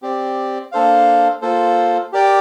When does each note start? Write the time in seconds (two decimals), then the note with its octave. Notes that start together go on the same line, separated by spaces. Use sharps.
0.02 C4 G4 D5
0.72 A#3 D4 A4 C5 F5
1.42 A#3 F4 A4 C5
2.12 G4 A#4 D5 G5